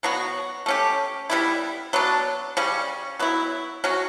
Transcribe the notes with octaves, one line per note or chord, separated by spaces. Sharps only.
B2 F#3 B3 F#4
A3 C#4 G4
G3 B3 E4
F#3 B3 D4
C#3 G3 C#4
F#3 B3 E4
F#3 C#4 F#4